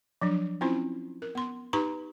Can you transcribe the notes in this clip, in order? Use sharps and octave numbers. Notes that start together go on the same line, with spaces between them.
F3 F#3 D4
C4 C#4 E4 F4 C5
A#4
B3 C6
D#4 G4 B4 A#5 C#6